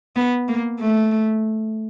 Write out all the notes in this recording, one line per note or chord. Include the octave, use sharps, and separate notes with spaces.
B3
A#3
A3